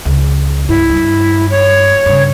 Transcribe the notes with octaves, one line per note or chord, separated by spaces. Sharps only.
C#2
G2 E4
G2
C#5
G2 C#3